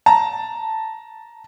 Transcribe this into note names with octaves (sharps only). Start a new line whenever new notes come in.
A5 A#5